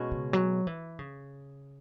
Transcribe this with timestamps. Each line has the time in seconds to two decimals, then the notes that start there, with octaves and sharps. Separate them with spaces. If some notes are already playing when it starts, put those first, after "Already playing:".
Already playing: B2 G#3 C#4 F#4
0.11 C#3
0.33 F#3
0.67 E3
0.99 C#3